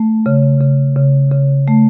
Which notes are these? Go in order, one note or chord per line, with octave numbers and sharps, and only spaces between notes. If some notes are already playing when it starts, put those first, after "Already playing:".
Already playing: A3
C#3
C#3
C#3
C#3
A3